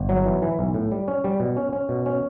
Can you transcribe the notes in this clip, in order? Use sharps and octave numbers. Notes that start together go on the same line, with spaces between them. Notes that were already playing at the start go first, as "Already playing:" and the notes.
Already playing: G1
F#3
E3
E3
B1
A2
G3
C#4
G3
B2
C#4
C#4
B2
C#4